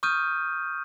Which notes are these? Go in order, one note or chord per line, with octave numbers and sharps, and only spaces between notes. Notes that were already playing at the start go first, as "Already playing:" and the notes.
C#6 D#6 F6 G6 D#7